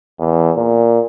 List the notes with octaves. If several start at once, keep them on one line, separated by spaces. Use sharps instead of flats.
E2
A#2